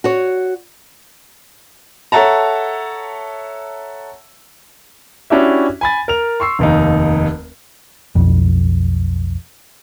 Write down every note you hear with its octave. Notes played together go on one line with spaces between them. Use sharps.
F#4 C#5
A4 C#5 E5 F#5 A5 A#5
C#4 D4 E4 F#4 G4 E5
G#5 B5 A6
A#4 F7
C6 C#6 E6 C7
F1 D#2 D#4
B1 F2